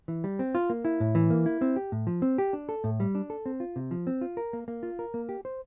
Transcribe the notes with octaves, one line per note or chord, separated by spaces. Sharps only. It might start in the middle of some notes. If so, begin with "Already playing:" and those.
E3
G3
C4
F4
A#3
E4
A2
E3
A#3
E4
C4
G4
A2
F3
C4
G4
D4
A4
A2
G3
D4
A4
C4
F4
C3
F3
C4
F4
A#4
A#3
A#3
F4
A#4
A#3
G4
C5